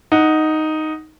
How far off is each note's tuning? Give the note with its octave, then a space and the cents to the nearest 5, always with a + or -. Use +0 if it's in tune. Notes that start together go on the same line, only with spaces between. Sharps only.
D#4 +0 F#5 +0